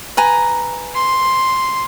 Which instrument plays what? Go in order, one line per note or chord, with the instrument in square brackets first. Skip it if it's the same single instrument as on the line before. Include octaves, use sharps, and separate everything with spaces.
[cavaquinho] B4 G#5 A#5
[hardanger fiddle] C6